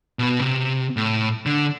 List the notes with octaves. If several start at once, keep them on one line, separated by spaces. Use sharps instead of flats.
B2 B4
C3
A2
D3